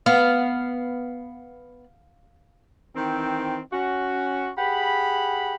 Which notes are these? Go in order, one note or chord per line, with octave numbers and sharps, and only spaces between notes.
B3 F5
D#3 E3 C4
C#4 F#4
G4 G#4 F#5 B5